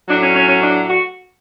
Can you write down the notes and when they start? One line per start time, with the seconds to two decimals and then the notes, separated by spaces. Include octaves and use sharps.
0.08 A2 F#3 D4
0.21 C#4
0.34 C#4
0.48 C#4
0.61 D4
0.88 F#4